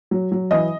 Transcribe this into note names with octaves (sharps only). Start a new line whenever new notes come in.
F#3
F#3
E3 D#5